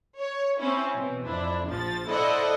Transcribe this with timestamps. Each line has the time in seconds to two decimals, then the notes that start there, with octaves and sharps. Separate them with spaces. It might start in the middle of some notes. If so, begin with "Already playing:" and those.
0.18 C#5
0.59 C4 C#4 E4
0.94 B2 E3 C4
1.24 F2 D4 E4
1.68 A#1 F3 A6
2.07 E4 A4 C5 D5 D#5 F#5